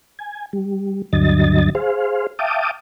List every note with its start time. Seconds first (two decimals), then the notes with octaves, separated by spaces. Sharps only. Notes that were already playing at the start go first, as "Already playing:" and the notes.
0.19 G#5
0.53 G3
1.13 D2 G2 D3 F#3 D#5 A6
1.75 G#4 C5 F5
2.39 E5 F5 G5 A5 D6 D#6